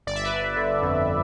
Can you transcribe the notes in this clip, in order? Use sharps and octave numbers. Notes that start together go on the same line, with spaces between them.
G1 D5
E5
B4 D5
G1
D3
F2